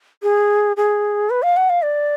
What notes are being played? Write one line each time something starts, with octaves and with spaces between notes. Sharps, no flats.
G#4
G#4
B4
F5
F#5
F5
D5